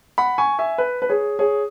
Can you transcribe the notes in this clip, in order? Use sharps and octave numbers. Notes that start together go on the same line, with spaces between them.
F#5 B5
G#5 C#6
E5 G#5
B4
B4
G#4 C#5
G#4 C#5